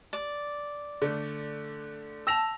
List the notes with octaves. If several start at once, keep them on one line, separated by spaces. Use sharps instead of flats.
D5
D3 A3
G5 A5 E6 A#6 F7